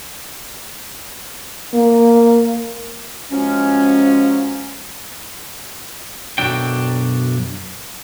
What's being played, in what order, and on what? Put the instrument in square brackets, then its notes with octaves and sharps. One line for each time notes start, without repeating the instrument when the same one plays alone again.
[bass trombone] A#3
[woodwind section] F3 F#3 G#3 C#4
[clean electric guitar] B1 F#2 F#3 D4 G5